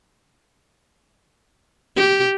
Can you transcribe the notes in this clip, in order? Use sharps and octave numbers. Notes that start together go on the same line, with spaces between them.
G4